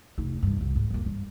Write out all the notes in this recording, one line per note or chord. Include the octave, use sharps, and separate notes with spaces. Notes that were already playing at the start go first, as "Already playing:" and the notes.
F1 D#4
C2 G2
C2 F2
G#2
F2 A#3
G2